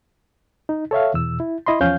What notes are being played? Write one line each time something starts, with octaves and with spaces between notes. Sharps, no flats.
D#4
A4 C#5 E5 F5
E2 B2 E6
E4
E4 D#5 B5 C6
E2 F3 C#4 F5 G6